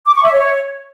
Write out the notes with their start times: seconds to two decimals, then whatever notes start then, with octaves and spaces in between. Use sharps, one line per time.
0.06 D6
0.15 C#6
0.24 E5
0.33 C#5